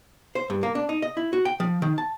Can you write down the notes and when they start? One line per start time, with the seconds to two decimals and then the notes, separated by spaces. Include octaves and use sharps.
0.35 C5
0.50 G2
0.63 A#3
0.75 D4
0.89 D#4
1.02 D#5
1.17 E4
1.33 F#4
1.45 G5
1.60 F3
1.82 D#3
1.98 A5